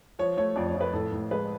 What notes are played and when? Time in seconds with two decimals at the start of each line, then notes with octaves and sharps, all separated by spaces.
0.19 F3 C#5
0.37 A3 C#5
0.56 F2 D5
0.68 C#5
0.75 F2
0.81 B4
0.93 A2 A4
1.12 A2
1.31 G#3 B4